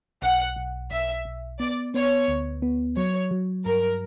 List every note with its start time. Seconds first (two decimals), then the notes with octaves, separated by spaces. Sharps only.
0.22 B1 F#5
0.56 B1
0.91 B1 E5
1.25 B1
1.60 B3 D5
1.94 B3 C#5
2.28 D2
2.62 B3
2.96 F#3 C#5
3.31 F#3
3.65 G2 A#4